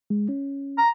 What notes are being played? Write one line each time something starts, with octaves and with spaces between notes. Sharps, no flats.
G#3
C#4
A#5